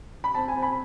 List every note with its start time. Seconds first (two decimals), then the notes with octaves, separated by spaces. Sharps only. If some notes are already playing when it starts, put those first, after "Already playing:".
0.24 B5
0.35 C4 A5
0.48 G#5
0.56 C4
0.63 B5